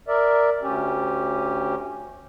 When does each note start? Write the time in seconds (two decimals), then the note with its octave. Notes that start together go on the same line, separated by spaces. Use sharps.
0.08 A#4 D5 E5
0.62 D2 C#4 G4